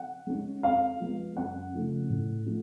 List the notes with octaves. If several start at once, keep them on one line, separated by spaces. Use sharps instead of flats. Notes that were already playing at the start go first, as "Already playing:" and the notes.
Already playing: F#5
G#3 C#4
F2 F5
F3 G#3 B3
F#2 F#5
C#3 F3 A3 C#4
A2
F3 A3 C#4